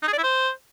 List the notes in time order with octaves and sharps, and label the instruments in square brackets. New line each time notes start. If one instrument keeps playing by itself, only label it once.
[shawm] D#4
G#4
D5
E4
C5